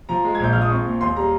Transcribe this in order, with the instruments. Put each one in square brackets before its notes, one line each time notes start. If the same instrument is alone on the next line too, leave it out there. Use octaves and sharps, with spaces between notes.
[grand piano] F3 A#5
G#3
G#6
A#1 G6
F3 F6
D#6
C4 C#6
A#2
D#2 C6
G3 A#5